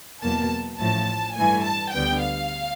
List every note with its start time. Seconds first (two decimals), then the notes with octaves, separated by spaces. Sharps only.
0.22 E2 B2 F#3 A#3 A5
0.80 A1 A2 F3 A5
1.37 G2 E3 A3 G#5
1.65 A5
1.94 D2 D3 G3 B3 G5
2.23 F5